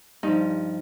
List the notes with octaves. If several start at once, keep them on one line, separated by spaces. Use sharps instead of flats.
G2 F3 D#4